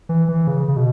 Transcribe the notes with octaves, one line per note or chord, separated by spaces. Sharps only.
E3
E3
C#3
C#3
B2